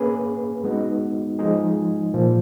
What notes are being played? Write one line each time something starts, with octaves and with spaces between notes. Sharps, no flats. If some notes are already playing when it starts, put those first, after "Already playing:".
Already playing: A#3 C#4 G#4 B4
G#3 B3 D#4 F#4
F3 G#3 D#4 G#4
A#2 F3 A#3